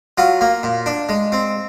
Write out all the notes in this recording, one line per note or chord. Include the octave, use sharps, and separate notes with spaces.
F#3 F4
A#3
A#2
D4
G#3
C4